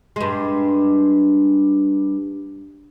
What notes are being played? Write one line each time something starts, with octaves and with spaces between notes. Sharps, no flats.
G2 G#3